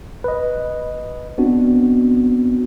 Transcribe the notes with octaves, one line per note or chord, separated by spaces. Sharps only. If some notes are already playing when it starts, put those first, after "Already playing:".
B4 D#5
B3 C4 D4 F#4